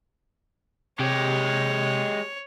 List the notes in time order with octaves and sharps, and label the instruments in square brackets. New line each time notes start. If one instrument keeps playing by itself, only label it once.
[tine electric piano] C3 [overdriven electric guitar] G#3 G4 [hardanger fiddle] C#5